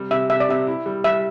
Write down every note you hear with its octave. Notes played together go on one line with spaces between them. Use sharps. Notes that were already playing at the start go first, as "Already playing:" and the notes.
Already playing: C3 G3
C3 E5
C3 E5
D5
C3 E5
E4
G3
G3 E5